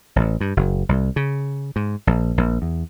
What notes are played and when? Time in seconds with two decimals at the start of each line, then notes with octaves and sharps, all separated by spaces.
0.16 A1
0.41 G2
0.57 F#1
0.89 C2
1.16 C#3
1.76 G#2
2.07 A#1
2.38 A#1
2.62 E2